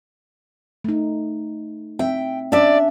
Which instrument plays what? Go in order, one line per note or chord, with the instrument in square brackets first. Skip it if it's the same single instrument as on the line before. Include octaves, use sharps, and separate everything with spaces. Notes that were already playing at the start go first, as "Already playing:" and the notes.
[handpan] A3 D#4
[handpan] C4 E5 [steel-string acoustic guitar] G5
[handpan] C#4 [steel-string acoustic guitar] D4 E5 [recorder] D5